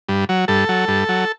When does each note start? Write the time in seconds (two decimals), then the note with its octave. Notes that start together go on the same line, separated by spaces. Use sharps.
0.09 G2
0.29 F#3
0.48 G2 A4
0.69 F#3
0.88 G2
1.09 F#3